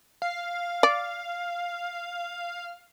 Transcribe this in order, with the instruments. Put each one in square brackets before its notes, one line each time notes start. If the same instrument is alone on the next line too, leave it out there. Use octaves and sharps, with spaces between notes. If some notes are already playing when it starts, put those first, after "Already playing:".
[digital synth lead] F5
[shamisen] D5